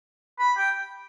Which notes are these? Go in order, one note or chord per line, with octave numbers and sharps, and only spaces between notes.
B5
G5